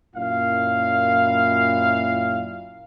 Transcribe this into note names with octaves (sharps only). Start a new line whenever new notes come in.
F#2 A#2 E4 F5